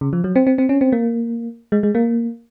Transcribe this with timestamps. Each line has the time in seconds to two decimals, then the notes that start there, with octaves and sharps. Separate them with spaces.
0.01 C#3
0.13 F3
0.24 F#3
0.36 C4
0.47 C4
0.58 C4
0.69 C#4
0.81 C4
0.92 A#3
1.72 G#3
1.83 G#3
1.95 A#3